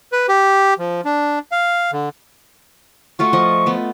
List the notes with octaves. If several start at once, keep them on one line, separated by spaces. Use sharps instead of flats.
B4
G4
F3
D4
F5
D3
A3 F4 F#4 C#6
F3 D#5
A3 B3